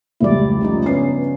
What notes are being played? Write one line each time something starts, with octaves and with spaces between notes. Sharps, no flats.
F1 C#2 G3 E4 D5
C#3 F3 D#4
G2 B3 C#4 C7